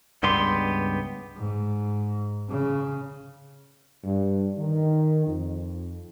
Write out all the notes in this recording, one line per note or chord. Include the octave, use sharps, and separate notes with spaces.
C#2 G2 B3 G4 C6
G#2
C#3
G2
D#3
F2